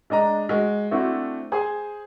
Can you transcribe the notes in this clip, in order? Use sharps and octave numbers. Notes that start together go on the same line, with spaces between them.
G#3 D4 D#5 A#5
G#3 F#4
A3 C4 D4 E4 F#4
G#4 C5 G#5